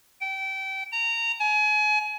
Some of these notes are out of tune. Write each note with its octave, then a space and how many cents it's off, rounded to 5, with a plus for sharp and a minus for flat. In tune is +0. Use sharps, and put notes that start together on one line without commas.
G5 -25
A#5 -20
G#5 +30